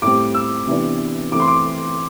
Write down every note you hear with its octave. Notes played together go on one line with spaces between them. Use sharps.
A2 G3 C4 D6
E6
C3 E3 B3 D4
E3 A3 C4 D6
C6
D6